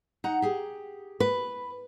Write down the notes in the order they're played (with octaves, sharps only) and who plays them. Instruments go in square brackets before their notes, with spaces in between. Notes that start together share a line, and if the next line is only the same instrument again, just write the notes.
[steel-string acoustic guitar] D#4 F#5 A#5
G4 G#4
[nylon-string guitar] B4